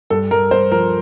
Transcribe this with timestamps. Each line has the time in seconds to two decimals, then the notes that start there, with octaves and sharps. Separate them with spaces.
0.10 G2 A4
0.31 G2 A#4
0.51 G2 C5
0.72 F3 A#4